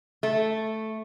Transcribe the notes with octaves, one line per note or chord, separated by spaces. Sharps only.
A3